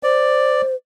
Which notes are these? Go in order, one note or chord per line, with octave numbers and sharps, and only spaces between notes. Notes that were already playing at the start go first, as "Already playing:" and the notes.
C5 D5